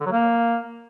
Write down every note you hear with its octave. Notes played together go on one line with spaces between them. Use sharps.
D3
F#3
A#3